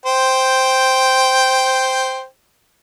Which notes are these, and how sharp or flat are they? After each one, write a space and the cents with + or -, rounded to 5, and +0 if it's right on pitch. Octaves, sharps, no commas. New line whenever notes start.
C5 +0 G5 +0